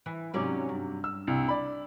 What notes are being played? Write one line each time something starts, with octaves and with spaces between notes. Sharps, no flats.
E3
G#2 C3 F#3 C#4 D5
G2
E6
C2
D5 B5